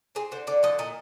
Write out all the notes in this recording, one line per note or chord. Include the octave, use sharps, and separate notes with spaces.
C4 G#4
D3 C5
D3 D5
F3 D#5
A#2 D#5